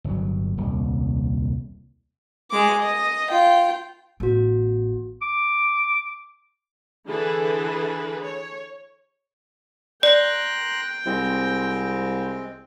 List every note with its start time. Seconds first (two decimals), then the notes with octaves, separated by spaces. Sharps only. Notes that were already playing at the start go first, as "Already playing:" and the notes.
0.04 G1 F#3
0.58 D#1 C2
2.51 G#3 D6
2.81 D#5
3.29 F4 G5
4.20 A1 B3 F#4
5.22 D6
7.06 D3 E3 E4 G#4 A4 B4
8.21 C#5
10.03 D5 G5 A#5 C6 F#6
11.06 C2 G#3 C4